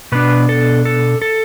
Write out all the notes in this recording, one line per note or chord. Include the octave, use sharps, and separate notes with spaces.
B2 B3 D4 B4
A4
A4
A4